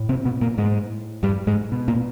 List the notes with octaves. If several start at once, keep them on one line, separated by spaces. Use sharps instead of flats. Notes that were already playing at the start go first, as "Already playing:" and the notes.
Already playing: A2
C3 C4
B2 B3
A#2 A#3
G#2 G#3
G2 G3
G#2 G#3
B2
A#2 A#3